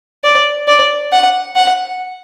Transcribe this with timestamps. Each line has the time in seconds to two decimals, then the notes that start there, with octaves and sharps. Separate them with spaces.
0.24 D5
0.68 D5
1.12 F#5
1.56 F#5